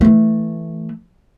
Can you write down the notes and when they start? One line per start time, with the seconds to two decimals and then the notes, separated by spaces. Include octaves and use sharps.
0.01 E3 A3